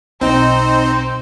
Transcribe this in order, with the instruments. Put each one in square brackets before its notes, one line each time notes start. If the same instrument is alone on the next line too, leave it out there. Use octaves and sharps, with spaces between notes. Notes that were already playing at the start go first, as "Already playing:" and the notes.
[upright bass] B1 [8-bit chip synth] C4 D#4 [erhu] C5